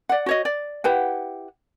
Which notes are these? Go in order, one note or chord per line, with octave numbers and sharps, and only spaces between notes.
D5 F#5
F#4 C#5 D#5
D5
E4 G4 B4 F#5